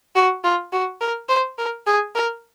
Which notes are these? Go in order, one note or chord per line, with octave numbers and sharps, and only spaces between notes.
F#4
F4
F#4
A#4
C5
A#4
G#4
A#4